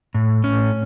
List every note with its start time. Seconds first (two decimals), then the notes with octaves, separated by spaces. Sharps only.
0.14 A2
0.44 C#4